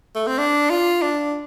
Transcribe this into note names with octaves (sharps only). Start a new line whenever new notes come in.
A3
C4
D4
F4
D4